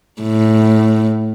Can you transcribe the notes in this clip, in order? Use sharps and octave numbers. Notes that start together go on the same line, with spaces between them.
A2